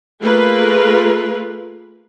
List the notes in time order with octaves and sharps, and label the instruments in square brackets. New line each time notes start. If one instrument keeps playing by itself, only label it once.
[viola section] A3 A#3 F4 G#4 A#4 B4